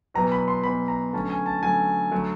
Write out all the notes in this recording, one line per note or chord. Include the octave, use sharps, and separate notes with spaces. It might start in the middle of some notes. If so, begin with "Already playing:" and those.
E2 B2 F#3 B3 A#5
B5
C6
E2 B2 F#3 B3 B5
A#5
D3 F#3 A3 C#4 A5
G#5
A5
D3 F#3 A3 C#4 G#5
D3 F#3 A3